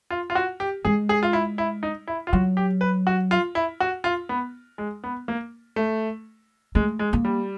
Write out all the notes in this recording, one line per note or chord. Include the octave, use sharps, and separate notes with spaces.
F4
F4
F#4
G4
G#3 G#4
G#4
F4
E4
E4
D#4
E4
F4
F#3 F#4
G4
B4
F#4
F4
E4
F#4
F4
B3
G#3
B3
A#3
A3
G#3 A3
G#3
A#3
G3